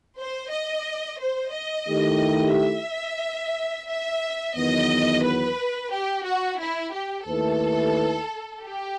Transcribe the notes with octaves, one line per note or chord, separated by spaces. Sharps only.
C5
D#5
C5
D#5
D#3 A3 E4 G4
E5
E5
E2 D#3 F#3 B3 D#5
B4
G4
F#4
E4
G4
D#2 D#3 A3 E4 A4 B4
G4